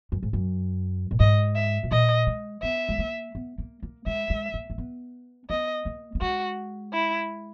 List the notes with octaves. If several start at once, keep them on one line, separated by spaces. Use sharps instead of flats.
F#2
G#2
F#2
A#2
G#2 D#5
E5
B2
A#2 D#5
G#3
B3 E5
G#3
A#3
B3
A#3
A#3
G#3 E5
G#3
A#3
A#3
B3
B3 D#5
A#3
A#3
G#3 F#4
E4